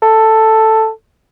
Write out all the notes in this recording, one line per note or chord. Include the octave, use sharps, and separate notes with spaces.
A4